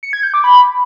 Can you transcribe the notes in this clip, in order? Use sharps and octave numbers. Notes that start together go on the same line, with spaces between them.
C#7
G#6
G6
D6
B5